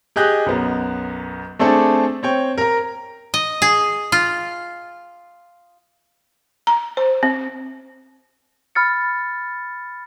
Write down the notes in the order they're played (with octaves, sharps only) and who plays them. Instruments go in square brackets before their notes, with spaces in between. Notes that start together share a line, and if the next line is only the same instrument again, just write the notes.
[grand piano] G4 G#4 D#5 F#6 G6
B1 F#2 B3
A3 C4 D4 G#4 A4
C4 C#5 G5
A#4 A#5
[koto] D#5
G#4
F4
[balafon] A#5
C5
C4
[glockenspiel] B5 F6 A6 C#7